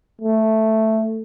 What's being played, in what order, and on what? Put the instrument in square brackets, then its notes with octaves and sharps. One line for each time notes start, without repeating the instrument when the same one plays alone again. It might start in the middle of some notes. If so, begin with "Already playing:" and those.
[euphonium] A3